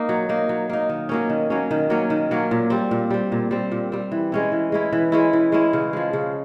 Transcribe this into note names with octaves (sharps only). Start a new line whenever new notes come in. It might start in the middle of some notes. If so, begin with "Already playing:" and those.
Already playing: A#3 D#4
F#3
A#3 D#4
F#3
A#3 D#4
D#3
F#3 A#3 C#4
D#3
F#3 A#3 C#4
D#3
F#3 A#3 C#4
D#3
F#3 A#3 C#4
A#2
G3 C4
A#2
G3 C4
A#2
G3 C4
A#2
G3 C4
E3
G#3 C#4 E4
E3
G#3 C#4 E4
E3
G#3 C#4 E4
E3
G#3 C#4 E4
C#3
F3 G#3
C#3